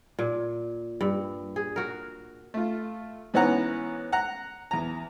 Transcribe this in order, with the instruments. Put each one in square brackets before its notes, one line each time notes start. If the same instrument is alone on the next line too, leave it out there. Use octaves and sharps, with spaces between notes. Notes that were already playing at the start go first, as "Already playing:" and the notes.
[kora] A#2
G2
G#4
F#4 A#4
[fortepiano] A3 F4
G#2 E3 B3 C#4 F#5 A#5
F#5 A#5
E2 A#5